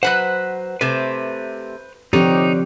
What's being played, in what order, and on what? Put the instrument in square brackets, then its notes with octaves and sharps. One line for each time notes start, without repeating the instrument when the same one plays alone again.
[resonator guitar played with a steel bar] F#3 B4 F#5 [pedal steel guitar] C5 F#6
[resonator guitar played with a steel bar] C3 A3 [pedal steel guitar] B4 C5
[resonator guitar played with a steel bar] D3 C#5 [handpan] F3 C4 G4 [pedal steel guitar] D#4